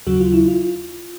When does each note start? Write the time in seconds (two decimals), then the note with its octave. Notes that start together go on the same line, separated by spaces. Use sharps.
0.07 D#2 C#3 F#3 F#4
0.20 F4
0.34 E4
0.48 F4